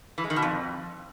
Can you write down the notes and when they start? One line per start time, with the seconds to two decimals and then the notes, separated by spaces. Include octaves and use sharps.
0.18 E3
0.24 G#3
0.30 D#3
0.36 B2
0.42 F2